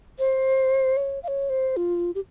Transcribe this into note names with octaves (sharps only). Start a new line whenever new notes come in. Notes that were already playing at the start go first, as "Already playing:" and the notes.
C5
C#5
F5
C#5
C5
F4
G4